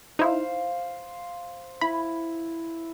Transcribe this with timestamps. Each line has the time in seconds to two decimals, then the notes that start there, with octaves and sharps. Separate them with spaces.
0.19 D#4 E4 C5 F5
1.81 E4 B5